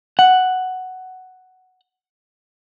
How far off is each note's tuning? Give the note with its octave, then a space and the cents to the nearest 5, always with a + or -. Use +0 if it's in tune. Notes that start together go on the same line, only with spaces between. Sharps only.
F#5 +5